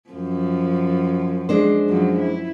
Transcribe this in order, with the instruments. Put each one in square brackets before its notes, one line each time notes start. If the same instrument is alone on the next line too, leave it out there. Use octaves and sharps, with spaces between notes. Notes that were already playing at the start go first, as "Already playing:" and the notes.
[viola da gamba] F#2 F3
[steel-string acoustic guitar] G#3 D4 C5
[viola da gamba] F#2 F3 F#3
E4